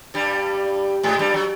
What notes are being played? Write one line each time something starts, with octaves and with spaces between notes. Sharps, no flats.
G2 G3
G#2 G#3
G2 G3
F#3